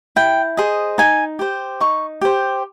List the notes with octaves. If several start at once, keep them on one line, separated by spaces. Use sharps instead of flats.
E4 G5
G#4 C5 D#5
D#4 G#5
G4 C5
D#4 C#6
G4 C5